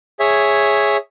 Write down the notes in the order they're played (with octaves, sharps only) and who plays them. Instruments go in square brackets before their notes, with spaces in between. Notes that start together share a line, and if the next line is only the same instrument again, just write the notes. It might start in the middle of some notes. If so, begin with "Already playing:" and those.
[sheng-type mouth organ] G#4 C#5 E5